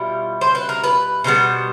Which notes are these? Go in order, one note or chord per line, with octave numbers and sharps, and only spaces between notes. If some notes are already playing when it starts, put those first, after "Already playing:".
Already playing: B2 G3 B3 E4 F4
C5
B4
A#4
B4
B2 G3 B3 C5